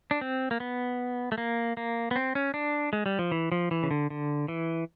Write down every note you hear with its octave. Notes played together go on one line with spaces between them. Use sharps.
D4
C4
A#3
B3
A3
A#3
A#3
B3
C4
C#4
D4
G#3
G3
F3
E3
F3
E3
C#3
D3
D3
E3